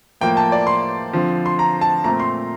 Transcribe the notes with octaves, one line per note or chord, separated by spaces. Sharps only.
A2 F3 A#3 G5
A5
D5
C6
D3 F3 C4
C6
A#5
A5
A#2 A3 C4 A#5
C6